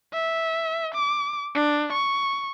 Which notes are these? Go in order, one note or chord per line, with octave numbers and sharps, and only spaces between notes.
E5
D6
D4
C#6